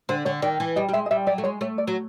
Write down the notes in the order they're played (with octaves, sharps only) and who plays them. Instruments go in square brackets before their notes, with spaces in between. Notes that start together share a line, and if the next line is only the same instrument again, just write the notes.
[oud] D3 [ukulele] C5
[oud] D3 [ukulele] C#5
[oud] D#3 [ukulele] D5
[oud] E3
[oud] G3 [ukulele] D#5
[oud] G3
[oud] G#3 [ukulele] E5
[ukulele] D#5
[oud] G3 [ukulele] E5
[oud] F#3 [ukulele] D5
[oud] A3
[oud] G#3 [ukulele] C#5
[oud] A3 [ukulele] C#5
[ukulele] D5
[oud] F#3